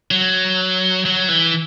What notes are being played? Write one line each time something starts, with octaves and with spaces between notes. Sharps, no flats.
F#3
F#3
E3